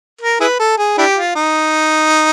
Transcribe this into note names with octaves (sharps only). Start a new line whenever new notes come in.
A#4
E4 G#4 B4
A4
G#4
D4 E4 G4
F4
D#4